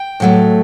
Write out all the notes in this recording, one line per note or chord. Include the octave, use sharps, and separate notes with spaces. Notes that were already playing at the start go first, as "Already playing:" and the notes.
Already playing: G5
A2 F#3 A3